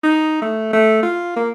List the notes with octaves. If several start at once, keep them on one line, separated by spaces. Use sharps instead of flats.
D#4
A3
A3
F4
A#3